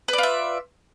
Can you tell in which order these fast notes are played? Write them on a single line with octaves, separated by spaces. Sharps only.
B4 D5 F4 E5